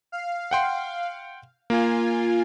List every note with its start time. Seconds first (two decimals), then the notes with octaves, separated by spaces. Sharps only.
0.12 F5
0.51 F#5 G5 C6
1.70 A#3 F4 G#5